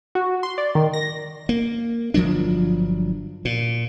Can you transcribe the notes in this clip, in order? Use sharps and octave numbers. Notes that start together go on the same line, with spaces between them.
F#4
C6
D5
D#3
A#6
A#3
G1 F3 F#3 D4
A#2